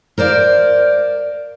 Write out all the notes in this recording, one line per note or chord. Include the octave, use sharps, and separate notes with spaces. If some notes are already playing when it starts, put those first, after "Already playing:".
A#4 C5 D5 F5